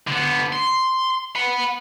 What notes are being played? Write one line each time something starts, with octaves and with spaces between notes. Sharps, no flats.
D3 B3
C6
F#5 B5